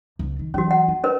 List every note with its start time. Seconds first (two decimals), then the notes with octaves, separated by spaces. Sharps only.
0.19 C#2
0.39 D#3
0.54 E3 F#3 C#4 F#4
0.71 F#5
0.88 F4
1.04 C#4 A#4 B4